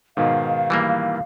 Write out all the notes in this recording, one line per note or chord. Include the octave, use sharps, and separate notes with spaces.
G#2 B2 D#3 F5
E3 G3 A#3